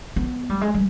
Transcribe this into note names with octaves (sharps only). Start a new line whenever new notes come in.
B3
G3
G#3
G3